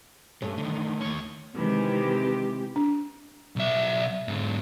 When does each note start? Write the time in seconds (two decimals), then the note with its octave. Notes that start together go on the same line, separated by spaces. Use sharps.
0.42 G2 A3 C#4
0.57 D3 D#3
1.01 D#2 C#5
1.55 C3 D#3 E3 G#3 G4
2.76 D4
3.56 B1 E5
4.28 G#2 D3